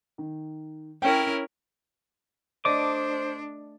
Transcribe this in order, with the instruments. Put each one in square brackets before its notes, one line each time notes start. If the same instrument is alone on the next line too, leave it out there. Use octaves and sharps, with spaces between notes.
[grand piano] D#3
[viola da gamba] C#4 E4 A#4 [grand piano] C#5 G5
[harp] A3 D5 D#5 [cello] D4 [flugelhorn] C5 [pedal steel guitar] D6